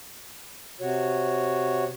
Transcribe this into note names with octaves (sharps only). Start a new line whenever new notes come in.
C3 F#4 C#5